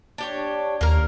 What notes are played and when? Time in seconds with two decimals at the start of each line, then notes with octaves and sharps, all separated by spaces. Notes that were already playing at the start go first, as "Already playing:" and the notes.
0.18 D4 G4 C#5
0.81 D#2 A#3 A#4